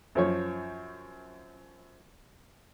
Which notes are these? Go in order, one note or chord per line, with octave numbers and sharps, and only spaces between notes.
F#2 F3 C#5